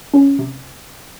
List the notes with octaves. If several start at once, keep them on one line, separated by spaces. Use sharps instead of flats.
C#4
C3